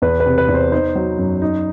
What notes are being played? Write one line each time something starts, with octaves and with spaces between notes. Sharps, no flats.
E2 B4
B4
C3
B4
E2
C5
D#4 C5
F#3
F#2
D#4